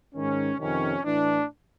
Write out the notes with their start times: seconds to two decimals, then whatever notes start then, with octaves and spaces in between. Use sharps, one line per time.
0.15 G#2 D#3 C#4
0.60 F2 C3 D#3 C#4
1.04 A2 E3 D4